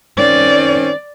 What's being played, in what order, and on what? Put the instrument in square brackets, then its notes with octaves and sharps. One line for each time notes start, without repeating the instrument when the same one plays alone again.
[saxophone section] D#3 C4 C#4 [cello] D5